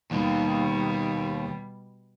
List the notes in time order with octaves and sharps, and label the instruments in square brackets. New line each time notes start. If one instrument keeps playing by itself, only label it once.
[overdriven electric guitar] D#2 D#3 [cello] B2 G3